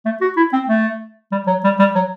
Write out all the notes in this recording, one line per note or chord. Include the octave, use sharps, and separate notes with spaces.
A3
F#4
E4
C4
A3
G3
F#3
G3
G3
F#3